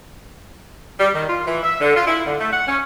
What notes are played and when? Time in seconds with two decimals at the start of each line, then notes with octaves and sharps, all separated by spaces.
0.99 G3
1.13 D#3
1.28 F4
1.46 E3
1.63 E5
1.81 D3
1.95 F4
2.07 E4
2.25 D3
2.39 A3
2.51 F#5
2.67 C#4